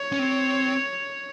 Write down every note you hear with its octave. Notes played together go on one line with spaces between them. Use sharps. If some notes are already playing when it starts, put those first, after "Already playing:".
Already playing: C#5
C#4
C4